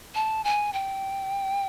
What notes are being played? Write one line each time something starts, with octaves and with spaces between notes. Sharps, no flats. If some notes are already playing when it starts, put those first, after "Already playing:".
A5
G#5
G5